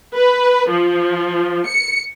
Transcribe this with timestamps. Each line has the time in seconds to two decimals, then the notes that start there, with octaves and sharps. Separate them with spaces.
0.15 B4
0.71 F3
1.67 C#7